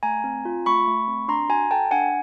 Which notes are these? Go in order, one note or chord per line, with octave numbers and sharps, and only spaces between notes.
A3 G#5 A#5
C4
F4
A3 B5 C#6
A3
C4
D4 A#5 C6
F#4 G#5 A#5
A4 G5 A5
D4 F#5 G#5